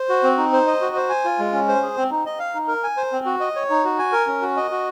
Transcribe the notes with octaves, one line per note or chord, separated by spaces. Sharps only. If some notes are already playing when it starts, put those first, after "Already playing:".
Already playing: C5
F#4
C4
D#4
C5
D#5
F#4
C5
G#5
F4
G#3
C#4
C5
G#4
C4
D#4
D#5
F5
D#4
A#4
G#5
C5
C4
F#4
D#5
C#5
D#4
F#4
G#5
A#4
C#4
F#4
D#5
F#4